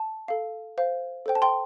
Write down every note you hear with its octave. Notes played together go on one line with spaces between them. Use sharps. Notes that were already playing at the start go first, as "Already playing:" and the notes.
Already playing: A5
A4 F5
C5 F5
A4 C5 G5
A5
G5 C6